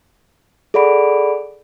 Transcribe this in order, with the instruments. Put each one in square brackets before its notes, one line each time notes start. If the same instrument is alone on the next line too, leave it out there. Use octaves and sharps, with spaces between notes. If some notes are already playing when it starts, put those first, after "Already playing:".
[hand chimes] G#4 A4 D5 F#5 B5 D7